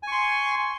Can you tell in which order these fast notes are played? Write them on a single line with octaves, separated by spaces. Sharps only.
G#5 C#6 C6